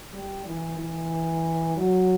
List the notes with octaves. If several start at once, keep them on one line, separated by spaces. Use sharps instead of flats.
G3
E3
E3
F#3